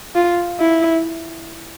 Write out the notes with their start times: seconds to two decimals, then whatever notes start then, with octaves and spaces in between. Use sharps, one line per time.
0.15 F4
0.59 E4